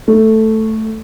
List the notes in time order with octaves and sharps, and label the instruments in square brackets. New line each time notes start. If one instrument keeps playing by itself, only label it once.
[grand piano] A3